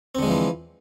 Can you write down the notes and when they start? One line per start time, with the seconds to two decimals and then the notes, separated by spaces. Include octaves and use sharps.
0.15 C4
0.19 D3
0.22 G#3
0.26 F3
0.30 E3